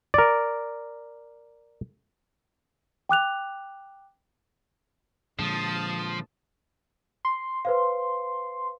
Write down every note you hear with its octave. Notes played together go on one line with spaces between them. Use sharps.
A#4 D5
G5 D6 F#6 F7
A#2 D3 F3 G#3 A5 D#6
C6
B4 C5 F5